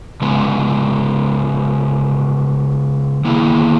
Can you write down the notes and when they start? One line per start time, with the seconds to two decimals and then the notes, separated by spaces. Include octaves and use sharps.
0.22 C#3 G#3 B3
3.25 D#3 A#3 E4 G#4